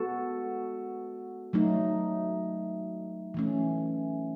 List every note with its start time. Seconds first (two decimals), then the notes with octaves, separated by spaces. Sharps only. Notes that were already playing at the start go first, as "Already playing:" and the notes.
Already playing: G#3 B3 F#4 A4
1.53 F#3 A3 D#4
3.34 E3 A3 C#4